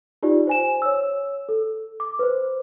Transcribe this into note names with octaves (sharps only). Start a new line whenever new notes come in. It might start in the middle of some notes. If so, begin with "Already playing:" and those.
D#4 F4 G4 D5
C5 G#5 E7
C#5 E6
A4
D6
B4 C5